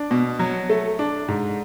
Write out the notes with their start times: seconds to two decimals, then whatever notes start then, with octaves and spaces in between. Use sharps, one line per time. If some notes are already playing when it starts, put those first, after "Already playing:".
Already playing: D4
0.11 B2
0.39 F#3
0.70 A3
0.99 D4
1.28 G#2